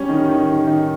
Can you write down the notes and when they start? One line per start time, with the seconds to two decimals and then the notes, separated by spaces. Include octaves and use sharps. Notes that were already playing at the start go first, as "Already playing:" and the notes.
Already playing: G3 C#4
0.09 D#3
0.29 D#3
0.48 D#3
0.67 D#3